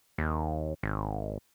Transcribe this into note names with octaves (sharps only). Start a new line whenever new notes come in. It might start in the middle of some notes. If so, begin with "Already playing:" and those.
D#2
G#1